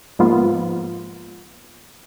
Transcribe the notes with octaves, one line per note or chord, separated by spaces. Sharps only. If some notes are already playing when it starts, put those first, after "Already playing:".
G#2 F3 A#3 B3 F4